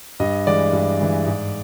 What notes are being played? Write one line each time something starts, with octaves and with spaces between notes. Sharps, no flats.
G2 D#5
E3 G#3 D5
G2
E3 G#3
G#2